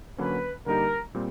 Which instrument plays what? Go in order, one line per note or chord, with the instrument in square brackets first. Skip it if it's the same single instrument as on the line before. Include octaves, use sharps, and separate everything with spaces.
[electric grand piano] D3 F#3 A#3 C#4 [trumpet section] B4
[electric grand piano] D3 G3 A#3 D#4 G4 [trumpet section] A#4
[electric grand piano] A#2 G3 C4